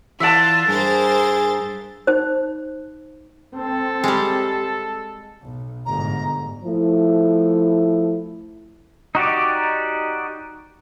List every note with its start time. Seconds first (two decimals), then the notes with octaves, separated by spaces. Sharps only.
0.20 E3 F4 D5 E5 F#5 A5
0.68 G2 G#4 A#4 C5 A6
2.07 D#4 C5
3.56 C4 A4
4.04 G3 G#3
5.42 B1
5.86 G1 G#2 A#5
6.64 F3 A3 E4
9.15 D#4 F#4 G4 D5